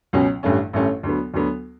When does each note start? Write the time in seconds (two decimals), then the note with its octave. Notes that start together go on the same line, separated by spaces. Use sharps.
0.13 C#2 B2 F#3 C#4
0.43 A1 G2 D3 A3 C#4
0.73 A1 G2 D3 A3 C#4
1.03 D2 D3 F#3 B3
1.34 D2 D3 F#3 B3